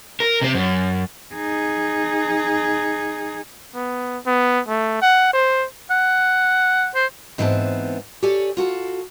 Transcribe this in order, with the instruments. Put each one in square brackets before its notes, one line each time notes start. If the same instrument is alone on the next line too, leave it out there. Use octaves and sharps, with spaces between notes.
[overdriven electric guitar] A#4
C3 C4
F#2
[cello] D#4 G#4
[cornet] B3
B3
A3
F#5
C5
[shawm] F#5
C5
[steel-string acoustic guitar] G#2 E3 B3 C4 A#4 A5
G4 A4 C#5 D5 G#5
F4 F#4 A4